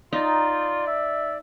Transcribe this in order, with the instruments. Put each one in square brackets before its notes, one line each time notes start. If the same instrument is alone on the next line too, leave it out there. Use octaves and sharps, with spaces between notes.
[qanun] D#4 [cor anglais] F4 [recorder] D5
[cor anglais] E5